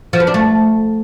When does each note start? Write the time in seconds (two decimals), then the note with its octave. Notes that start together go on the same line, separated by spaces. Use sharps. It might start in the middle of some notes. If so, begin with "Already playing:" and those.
0.13 F3
0.20 B3
0.27 D4
0.34 A3